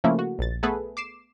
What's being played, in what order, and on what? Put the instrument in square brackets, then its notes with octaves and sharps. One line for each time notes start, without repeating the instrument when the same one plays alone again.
[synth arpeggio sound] C#3 F3 A3 A#3 E4
F#4
A#1 A6
A3 B3 G#4 A4 B4
D6 C7 E7